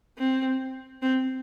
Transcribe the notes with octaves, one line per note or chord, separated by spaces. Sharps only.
C4
C4